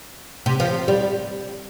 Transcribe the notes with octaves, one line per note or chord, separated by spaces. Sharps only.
C3
F3
G3